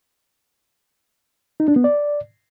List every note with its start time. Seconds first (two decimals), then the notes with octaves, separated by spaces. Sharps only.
1.60 D#4
1.68 D4
1.76 B3
1.84 D5